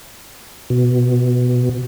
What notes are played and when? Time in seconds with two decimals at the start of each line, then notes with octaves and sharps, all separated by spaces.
0.70 B2